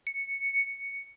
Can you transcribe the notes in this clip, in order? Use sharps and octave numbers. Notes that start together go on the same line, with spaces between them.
C#7